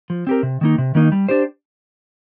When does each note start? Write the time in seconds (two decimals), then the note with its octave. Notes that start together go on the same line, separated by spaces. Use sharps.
0.10 F3
0.27 C4 G4 A#4
0.43 C3
0.61 D#3 A#3 D#4
0.78 C3
0.95 D#3 A#3 D#4
1.12 G3
1.29 D4 G4 C5